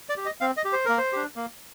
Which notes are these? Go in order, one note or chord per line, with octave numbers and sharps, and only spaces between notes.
D5
G4
D#5
C4 F5
D#5
G4
C5
A#3 A#4
C5
D4 G4
A#3